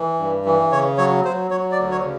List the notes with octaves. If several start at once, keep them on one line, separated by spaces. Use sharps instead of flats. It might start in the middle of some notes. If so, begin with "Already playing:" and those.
Already playing: E3
G2
E3
C#3 C#5
F#3 C#5
F#3 C5
F#3 C#5
D5
D2
C#5
C#3